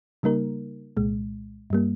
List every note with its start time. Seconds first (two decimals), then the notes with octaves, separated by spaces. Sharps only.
0.23 C#3 G3 A#3 D#4 A#4
0.97 C2 A#2 G#3
1.70 G2 G3 A#3